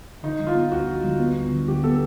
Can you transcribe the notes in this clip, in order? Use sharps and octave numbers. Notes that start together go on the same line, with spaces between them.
D3 D#4
G3
F4
B3
D2 F#4
D3
G3
B3
D2
D3
G3 G4
B3 A4